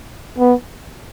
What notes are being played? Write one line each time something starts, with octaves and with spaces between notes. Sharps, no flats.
B3